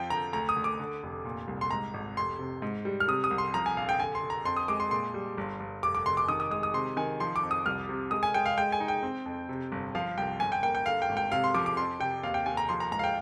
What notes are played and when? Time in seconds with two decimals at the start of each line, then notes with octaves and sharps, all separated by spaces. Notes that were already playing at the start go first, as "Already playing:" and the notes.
Already playing: F2 F3 G5
0.10 D3 A#5
0.33 D2 A#5
0.49 D#6
0.56 D2
0.64 D6
0.79 D3
1.03 F1
1.25 A#2
1.48 C2
1.61 C6
1.71 G#2 A#5
1.94 G#1
2.17 F1 C6
2.39 C3
2.62 G#2
2.85 G3
3.00 F6
3.08 C3 D#6
3.24 D#6
3.31 C2
3.38 C6
3.54 F3 A#5
3.66 G#5
3.77 A#1 F5
3.89 G5
4.00 D3 G#5
4.15 C6
4.22 D3
4.30 A#5
4.45 F2 C6
4.57 D#6
4.68 G#3 D6
4.80 C6
4.91 A#2 C6
5.14 G3
5.38 G1
5.60 G1
5.83 F1 D6
5.95 D6
6.06 F1 C6
6.17 D6
6.28 D#3 D#6
6.40 D#6
6.51 G#3 D#6
6.63 D#6
6.74 C3 C6
6.97 D#3 G#5
7.20 F3 C6
7.36 D6
7.43 F2
7.51 D#6
7.66 C2 F6
7.89 C3
8.11 G#3 D#6
8.23 G#5
8.34 G#3 G5
8.46 F5
8.58 G#3 G5
8.72 G#5
8.80 D#4
8.88 G5
9.03 C4
9.26 F2
9.49 C3
9.72 G1
9.95 F3 F5
10.17 C2 G5
10.40 G1 G#5
10.52 G5
10.63 A#3 G5
10.75 G5
10.86 D3 F5
11.02 G5
11.09 G#1
11.17 G5
11.32 C3 F5
11.44 C6
11.54 F3 D6
11.66 D6
11.77 F2 C6
12.00 C3 G5
12.23 D#2 F5
12.34 G5
12.46 D#2 G#5
12.57 A#5
12.69 F3 C6
12.80 A#5
12.92 G#2 A#5
12.99 F5
13.04 G5